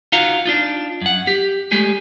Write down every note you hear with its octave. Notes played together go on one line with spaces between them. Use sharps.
D#4 F4 F#4 F5 F#5 A#5
D4 D#4 F4
F#2 F#5
G4
G#3 A3 G4 G#4